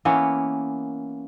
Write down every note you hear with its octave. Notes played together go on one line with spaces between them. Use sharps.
E3 A#3 B3 C#4